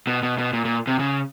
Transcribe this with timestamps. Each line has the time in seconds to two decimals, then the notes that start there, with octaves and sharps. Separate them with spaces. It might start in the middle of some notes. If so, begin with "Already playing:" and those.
0.07 B2
0.23 B2
0.38 B2
0.53 A#2
0.65 A#2
0.87 C3
0.99 C#3